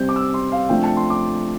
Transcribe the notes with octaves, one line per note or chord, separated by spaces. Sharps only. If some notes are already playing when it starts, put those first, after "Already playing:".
Already playing: C3 G3 C4 G6
D6
E6
C6
F5
C3 F3 A3 D4 G5
A5
C6
D6